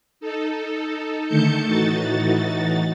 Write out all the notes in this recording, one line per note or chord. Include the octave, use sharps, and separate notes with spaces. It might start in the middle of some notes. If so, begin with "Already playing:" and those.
D#4 A4
D3 D#3 A3 A5 G6 C#7
A2 E3 D#4 F#4 A6